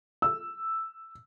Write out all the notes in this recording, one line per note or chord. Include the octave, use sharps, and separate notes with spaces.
E6